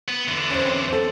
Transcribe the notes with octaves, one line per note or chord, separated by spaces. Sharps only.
B3
E2 D3
C#4 C5
C4
A4 C5